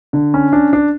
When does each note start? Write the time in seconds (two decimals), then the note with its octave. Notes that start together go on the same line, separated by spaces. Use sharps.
0.13 D3
0.34 C#4
0.53 D4
0.73 D4